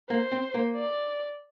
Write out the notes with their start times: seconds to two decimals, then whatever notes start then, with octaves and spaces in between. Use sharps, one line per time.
0.10 A#3 C5
0.32 C4
0.54 A#3
0.76 D5